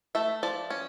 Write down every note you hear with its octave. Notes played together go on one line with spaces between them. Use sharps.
A3 E5
F3 D5
C#4